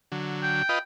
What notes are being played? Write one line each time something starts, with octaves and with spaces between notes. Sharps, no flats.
D3 F#3
G5
F4 B4 D#5